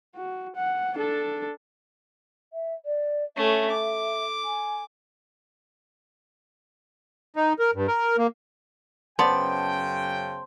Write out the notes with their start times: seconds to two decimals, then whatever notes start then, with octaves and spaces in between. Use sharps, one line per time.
0.16 F#4
0.56 F#5
0.95 D4 A4
2.53 E5
2.85 D5
3.37 A3 C#4 E5
3.70 D6
4.44 G#5
7.36 D#4
7.59 A#4
7.75 G2
7.88 A#4
8.18 A#3
9.19 F#2 C#3 B3 C5 D5 G5 A5